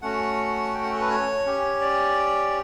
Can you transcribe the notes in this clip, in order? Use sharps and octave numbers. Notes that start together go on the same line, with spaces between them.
A3 C#4 F#4 F#5
G5
F#5
A4
B4
C#5
C#4 G4
D5